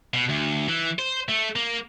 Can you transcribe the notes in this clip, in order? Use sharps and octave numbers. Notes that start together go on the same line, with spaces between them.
B2
D2
E3
C5
A3
A#3